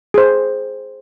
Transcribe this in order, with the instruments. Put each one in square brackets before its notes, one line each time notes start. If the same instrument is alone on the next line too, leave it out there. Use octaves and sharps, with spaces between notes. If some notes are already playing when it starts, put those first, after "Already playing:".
[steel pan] G#4 C5